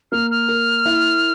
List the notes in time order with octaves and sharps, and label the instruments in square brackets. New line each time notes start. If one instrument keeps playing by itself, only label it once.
[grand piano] A#3 [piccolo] F6
[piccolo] F6
[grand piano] A#4
E4